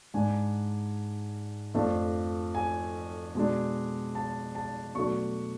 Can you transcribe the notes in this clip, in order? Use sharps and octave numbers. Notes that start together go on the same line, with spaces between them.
G#2 G#3 D4 G#5
F2 F3 A3 D4
G#5
B2 G#3 D4
A5
A5
B2 F#3 A3 D4 C#6